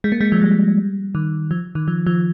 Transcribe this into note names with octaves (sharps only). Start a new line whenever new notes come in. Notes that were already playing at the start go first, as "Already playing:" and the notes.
G#3
A#3
G#3
F3
G3
D#3
F3
D#3
F3
F3